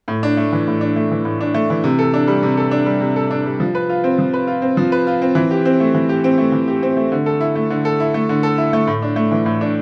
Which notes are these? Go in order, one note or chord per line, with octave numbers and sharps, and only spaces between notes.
A2
D4
A3
E3
A2
D4
A3
E3
A2
D4
A3
E3
C3
A4
D4
G3
C3
A4
D4
G3
C3
A4
D4
G3
F3
B4
F4
C4
F3
B4
F4
C4
F3
B4
F4
C4
E3
G4
C4
A3
E3
G4
C4
A3
E3
G4
C4
A3
D3
A4
E4
A3
D3
A4
E4
A3
D3
A4
E4
A3
A2
D4
A3
E3
A2
D4